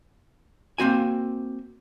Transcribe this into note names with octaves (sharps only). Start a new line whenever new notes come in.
A#3 C4 F#4 G#5